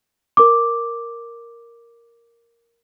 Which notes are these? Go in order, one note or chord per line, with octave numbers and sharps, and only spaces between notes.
A#4 D6